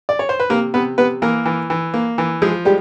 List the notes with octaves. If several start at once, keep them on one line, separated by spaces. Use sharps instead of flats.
D5
C#5
C5
B4
C3 A#3 A#4
C3 B3 B4
C3 B3 B4
E3 A#3 A#4
E3
E3
A#3
E3
F3 G#3 G#4
G3 G#3 G4